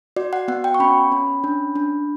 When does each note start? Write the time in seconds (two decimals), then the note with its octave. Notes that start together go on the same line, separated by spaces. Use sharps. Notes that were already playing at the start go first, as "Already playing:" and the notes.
0.16 F#4 D5
0.33 F#5
0.48 B3 F#5
0.64 G5
0.74 C#6
0.80 C#4 B5
1.12 C#4
1.44 D4
1.76 D4